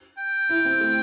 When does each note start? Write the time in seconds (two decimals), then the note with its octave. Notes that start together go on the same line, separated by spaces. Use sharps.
0.19 G5
0.49 E4
0.65 C4
0.81 A3